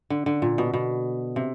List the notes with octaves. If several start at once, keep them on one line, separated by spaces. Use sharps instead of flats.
D3
D3
A#2
B2
B2
C3